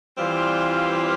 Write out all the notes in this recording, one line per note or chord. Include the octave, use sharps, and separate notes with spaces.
E3 G3 C4 F4